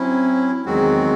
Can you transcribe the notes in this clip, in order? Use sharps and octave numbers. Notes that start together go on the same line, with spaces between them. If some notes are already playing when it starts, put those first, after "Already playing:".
Already playing: F#3 C4 C#4 E4
E2 D#3 F#3 G#3 C4 F#4